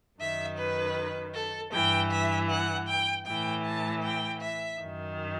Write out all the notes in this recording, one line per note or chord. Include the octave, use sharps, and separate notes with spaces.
F#2 D#3 E5
B4
A4
G2 E3 G5
E5
F#5
G5
A2 E3 G5
A5
G5
E5
F#2 D#3